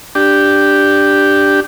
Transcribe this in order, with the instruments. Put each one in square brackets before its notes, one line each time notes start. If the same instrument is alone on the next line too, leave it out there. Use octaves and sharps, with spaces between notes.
[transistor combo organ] D4 G4